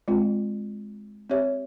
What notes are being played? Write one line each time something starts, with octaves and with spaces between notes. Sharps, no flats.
G#3 C4 F4
C4 G4 C#5 E5